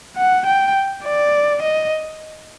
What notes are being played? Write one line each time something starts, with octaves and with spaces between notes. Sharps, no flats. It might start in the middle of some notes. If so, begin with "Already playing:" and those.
F#5
G5
D5
D#5